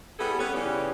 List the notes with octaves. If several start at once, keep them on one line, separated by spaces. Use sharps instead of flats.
G3 B3 E4 G#4 A4
B3 C#4 C#5
C#3 E3 G3 C#4 D#4 G4